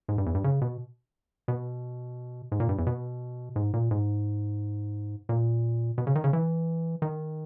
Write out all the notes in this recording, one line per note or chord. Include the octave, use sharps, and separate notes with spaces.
G#2
G2
E2
G2
C#3
B2
B2
G#2
A#2
G2
E2
B2
G#2
A#2
G#2
A#2
B2
C#3
D#3
C#3
E3
D#3